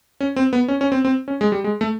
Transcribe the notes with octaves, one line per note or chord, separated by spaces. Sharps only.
C#4
C4
B3
C#4
C#4
C4
C4
C#4
G#3
G3
G#3
A3